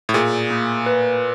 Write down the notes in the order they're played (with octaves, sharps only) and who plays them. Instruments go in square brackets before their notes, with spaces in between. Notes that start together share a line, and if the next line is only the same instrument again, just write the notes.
[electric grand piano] A2
[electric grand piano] A#2 [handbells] G#4
[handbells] A#3
B4